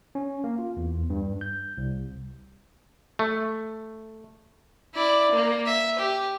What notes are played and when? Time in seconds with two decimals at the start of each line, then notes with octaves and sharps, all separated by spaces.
0.15 C#4
0.44 A#3
0.59 F4
0.77 E2
1.10 G2
1.41 G6
1.77 C2
3.19 A3
4.94 E4 D5
5.32 A#3
5.66 E5
5.99 G4